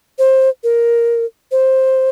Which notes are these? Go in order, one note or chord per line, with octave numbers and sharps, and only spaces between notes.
C5
A#4
C5